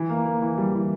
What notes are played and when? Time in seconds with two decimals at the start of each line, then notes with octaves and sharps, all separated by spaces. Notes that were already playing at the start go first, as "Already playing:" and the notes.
Already playing: E3
0.09 A#3
0.25 A#3
0.42 E3
0.58 G3
0.74 E3